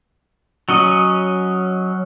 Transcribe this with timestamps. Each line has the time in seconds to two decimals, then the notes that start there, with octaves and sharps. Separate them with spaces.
0.69 F#3 C#4 D#5